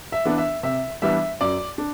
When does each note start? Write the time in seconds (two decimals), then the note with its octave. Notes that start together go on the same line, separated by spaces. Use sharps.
0.12 E5
0.25 E3 B3 D4
0.38 E5
0.63 C3 E5
1.02 E3 G3 B3 D4 E5
1.41 F#2 D5
1.78 D4